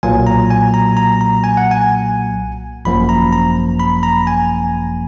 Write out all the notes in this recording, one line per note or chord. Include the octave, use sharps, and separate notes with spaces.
B1 A#2 F#3 A#3 G#5
A#5
G#5
A#5
A#5
A#5
G#5
F#5
G#5
G#1 F#2 F3 A#3 B5
A#5
A#5
B5
A#5
G#5